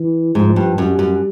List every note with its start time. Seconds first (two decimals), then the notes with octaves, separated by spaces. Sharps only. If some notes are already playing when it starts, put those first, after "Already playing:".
Already playing: E3
0.35 G#2 F3
0.56 G2
0.78 F#2 G3
0.99 F#2